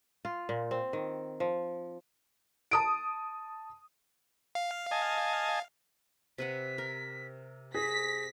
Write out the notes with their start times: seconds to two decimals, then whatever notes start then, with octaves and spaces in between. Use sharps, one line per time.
0.25 F4
0.49 A#2
0.71 C4
0.93 D#3
1.40 F3
2.71 A5 D#6 D7
4.55 F5
4.91 D#5 G#5 A5
6.38 C3 B4 F#5 B6
6.78 A#4
7.75 G#4 A#6 B6